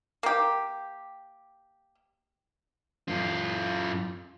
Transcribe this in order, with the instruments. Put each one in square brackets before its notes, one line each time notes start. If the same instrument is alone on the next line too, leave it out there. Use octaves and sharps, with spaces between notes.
[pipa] A#3 G4
[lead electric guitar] F#2 F4